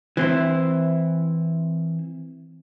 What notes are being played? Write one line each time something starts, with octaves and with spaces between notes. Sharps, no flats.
E3 C4 E4